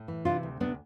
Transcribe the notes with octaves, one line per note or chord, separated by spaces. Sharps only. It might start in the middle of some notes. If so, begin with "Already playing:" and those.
Already playing: A2
E3
C3 D4 F4
D2
C3 B3 D4